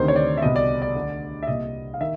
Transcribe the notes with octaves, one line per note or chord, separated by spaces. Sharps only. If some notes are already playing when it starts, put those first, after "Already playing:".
Already playing: D2 C3 D#3 C5
C#5
D5
E5
C2 B2 D#5
D5
D5
D2 D3
E5
C2 A#2 D#5
F5
D#3 E5